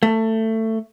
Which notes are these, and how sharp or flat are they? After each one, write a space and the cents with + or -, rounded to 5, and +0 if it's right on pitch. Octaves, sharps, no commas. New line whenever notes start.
A3 +20